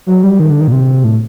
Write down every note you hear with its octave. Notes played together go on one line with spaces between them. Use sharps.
F#3
G3
D#3
D3
D#3
A#2
C3
A2